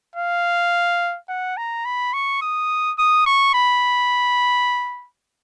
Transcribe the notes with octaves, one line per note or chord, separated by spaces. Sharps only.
F5
F#5
A#5
B5
C#6
D#6
D#6
C#6
B5